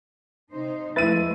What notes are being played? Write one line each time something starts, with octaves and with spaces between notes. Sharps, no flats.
C3 D#4 C5
F3 G#3 A3 E4 B4 A6 D#7